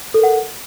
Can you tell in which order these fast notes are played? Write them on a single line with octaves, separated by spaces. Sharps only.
A4 A#4 F#5